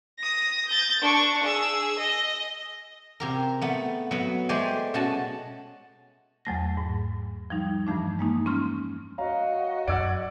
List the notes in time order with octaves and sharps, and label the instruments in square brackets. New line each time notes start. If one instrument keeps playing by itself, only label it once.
[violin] D#6 A#6
G6 A6
D4 C#6
G#4 E6
D#5
[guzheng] C3 G4 A#4
A3 B3
F#3 B3
G#3 A3 G4 C5 D5 G#5
B2 C#4 F#4 A5
[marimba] E2 F#3 A3 A#6
G#2
F3 G3 D#4
G2 E3 F3 A3 D4
G#3 A#3 D#4
C#4 C6 F6
[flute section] F#4 D#5 [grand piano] C#5 F5 A#5
[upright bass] F#2 F#3 [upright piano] D5 F#5 [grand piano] E6 G#6 D7